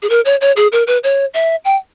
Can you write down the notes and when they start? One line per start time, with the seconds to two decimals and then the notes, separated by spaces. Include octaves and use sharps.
0.02 G#4
0.10 A#4
0.25 C#5
0.41 C#5
0.56 G#4
0.72 A#4
0.87 B4
1.04 C#5
1.34 E5
1.65 G5